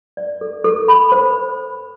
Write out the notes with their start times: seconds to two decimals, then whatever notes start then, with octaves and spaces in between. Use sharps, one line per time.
0.17 D5
0.41 A4
0.64 A4
0.88 B5
1.12 C5